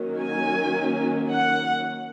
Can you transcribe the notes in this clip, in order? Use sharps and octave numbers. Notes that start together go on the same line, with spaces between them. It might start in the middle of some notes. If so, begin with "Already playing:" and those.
Already playing: D#3 F#3 A#3 C#4
G#5
F#5